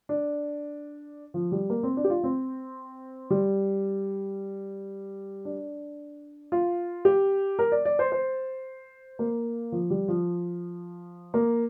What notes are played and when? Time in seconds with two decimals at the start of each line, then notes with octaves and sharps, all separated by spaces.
0.09 D4
1.34 F3
1.52 G3
1.70 A#3
1.83 C4
1.97 D4
2.04 G4
2.10 F4
2.24 C4
3.30 G3
5.45 D4
6.52 F4
7.05 G4
7.59 A#4
7.72 D5
7.85 D5
7.99 C5
8.12 C5
9.19 A#3
9.72 F3
9.90 G3
10.08 F3
11.34 A#3